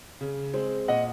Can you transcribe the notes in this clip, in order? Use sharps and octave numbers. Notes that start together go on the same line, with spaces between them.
C#3
G#3 C4
A#2 D#5 F#5